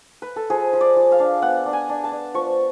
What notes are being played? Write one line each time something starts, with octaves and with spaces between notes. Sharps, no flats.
B4
A4
F3 G#4
F3
D5
F3
F5
D4
B3 F#5
D4
G#5
D4
A5
D4
F3 C#6